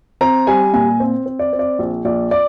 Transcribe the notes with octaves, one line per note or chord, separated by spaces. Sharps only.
C4 A#5
G3 G#5
A#2 G#5
C4
C4
D5
C4
D5
A#1
A#1 D5
D5